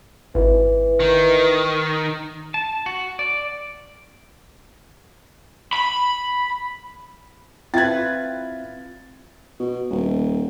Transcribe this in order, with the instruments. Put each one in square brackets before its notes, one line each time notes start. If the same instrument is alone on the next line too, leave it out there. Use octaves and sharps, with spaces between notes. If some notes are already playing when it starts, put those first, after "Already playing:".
[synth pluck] G#1 [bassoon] E3
[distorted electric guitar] D#3
[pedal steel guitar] A5
F#4
D5
[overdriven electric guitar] B5
[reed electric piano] C4 E5 [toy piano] E4 G5 [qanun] F4 B4 [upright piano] G#6 A6
[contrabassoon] B2
D#1